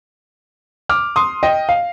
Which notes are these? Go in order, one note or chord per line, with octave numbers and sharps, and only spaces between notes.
D6 F6
C6 D#6
D#5 G5
F5